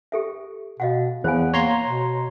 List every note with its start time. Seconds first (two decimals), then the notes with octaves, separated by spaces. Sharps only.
0.12 G4 A4 E5
0.80 B2 D#5 F5 F#5
1.24 E2 B3 C5 F5 G#5
1.54 A#3 C#5 A#5 C6
1.84 B2